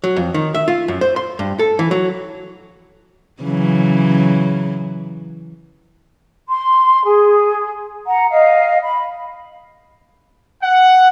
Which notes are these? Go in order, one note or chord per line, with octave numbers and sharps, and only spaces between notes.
F#3
F2
D#3
E5
F4
F#2
C5
C6
G2
A4
E3
F#3
C#3 E3 F#3
C6
G#4
F#5 A#5
D#5 F5
B5
F#5